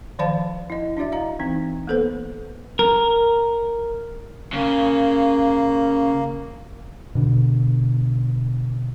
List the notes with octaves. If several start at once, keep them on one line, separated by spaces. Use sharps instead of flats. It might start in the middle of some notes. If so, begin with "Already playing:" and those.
D#3 F3 C5 D5 F5 A5
E4 D#5
D4 E4 F#4 D5 E5
D#5 F5 A#5
E3 C4 D#4
A#3 B3 A4 B4 C5
A#4
C#3 A#3
B2 D3